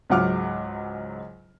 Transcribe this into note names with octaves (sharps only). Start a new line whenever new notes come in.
C#2 G#2 F#3 F#5 D6 F6